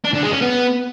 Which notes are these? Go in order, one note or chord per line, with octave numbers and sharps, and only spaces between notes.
D4
D3
G#3
C#4
B3